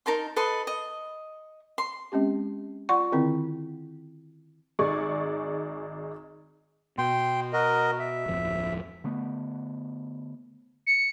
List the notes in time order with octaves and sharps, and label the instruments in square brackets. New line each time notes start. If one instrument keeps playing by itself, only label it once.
[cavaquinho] D#4 A#4 A5 C6
A4 B4 D#5 C6
D#5
C6
[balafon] G#3 C4 C#4 G4
F4 D5 F#5 C6 C#6
D3 D#3 C4 E4
[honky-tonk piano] G#1 D#4 G#4 D5 C#6
[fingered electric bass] B2 [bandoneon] G5 C6
[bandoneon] F#4 A#4 D#5
E5
[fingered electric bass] D1 F2
[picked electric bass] D3 A3 B3
[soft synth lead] C#7